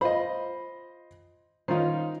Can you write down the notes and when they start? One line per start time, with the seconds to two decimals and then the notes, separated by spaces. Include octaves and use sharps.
0.01 F4 C5 D#5 B5
1.68 D#3 C#4 D#4 F4 C5